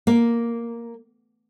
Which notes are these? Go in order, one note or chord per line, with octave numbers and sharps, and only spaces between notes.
A#3